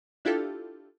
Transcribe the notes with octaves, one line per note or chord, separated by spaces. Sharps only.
D4 E4 F4 G4 A4